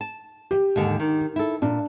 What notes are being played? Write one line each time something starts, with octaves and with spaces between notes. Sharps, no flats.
A5
G4
D#2 G#2 D3
D#3
E4 A4
A#2 D4